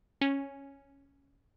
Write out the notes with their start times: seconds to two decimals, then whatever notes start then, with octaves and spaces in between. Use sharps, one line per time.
0.21 C#4